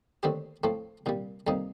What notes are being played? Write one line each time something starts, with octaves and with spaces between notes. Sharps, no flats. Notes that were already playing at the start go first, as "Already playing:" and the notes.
D#2 D3 A3 C4 G4
A2 F3 A3 C4
C2 A#2 G3
F2 C3 G3 A#3 D#4